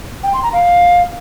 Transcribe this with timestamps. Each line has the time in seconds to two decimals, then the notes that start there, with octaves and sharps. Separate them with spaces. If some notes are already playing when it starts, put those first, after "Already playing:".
0.23 G5
0.33 C6
0.43 A#5
0.53 F5